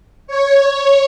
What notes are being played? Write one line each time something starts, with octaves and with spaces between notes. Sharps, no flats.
C#5